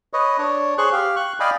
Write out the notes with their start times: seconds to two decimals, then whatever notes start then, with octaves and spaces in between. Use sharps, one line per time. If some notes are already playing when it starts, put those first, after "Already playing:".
0.13 B4 C#5 D#5
0.38 D4 C#5
0.78 G#4 C5 C#5 C#6 F#6
0.92 G4 F5
1.16 C#6 F#6
1.40 D5 D#5 F5 G5 G#5 B5